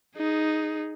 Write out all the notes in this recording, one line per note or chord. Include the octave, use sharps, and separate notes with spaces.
D#4 G#4